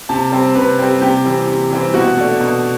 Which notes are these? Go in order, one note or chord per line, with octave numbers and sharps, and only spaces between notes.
C3 A5
G3 C4
C3 B4
G3 C4
C3 G4
E3 G3 C4
C3
E3 G3 C4
B2 F#4
A3 D4
B2